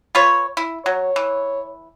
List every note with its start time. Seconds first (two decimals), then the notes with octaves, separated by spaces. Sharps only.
0.15 F4 B4 C#5
0.57 E4
0.86 F#3 C#5
1.16 E3